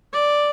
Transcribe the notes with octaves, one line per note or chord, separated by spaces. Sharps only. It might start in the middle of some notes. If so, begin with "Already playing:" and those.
D5